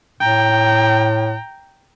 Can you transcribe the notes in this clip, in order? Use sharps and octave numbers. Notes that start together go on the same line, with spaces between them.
A2 G5 A#5